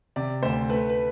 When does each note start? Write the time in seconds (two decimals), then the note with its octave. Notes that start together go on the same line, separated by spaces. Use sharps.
0.16 C3 D5
0.43 D2 C5
0.70 A3 B4
0.90 B4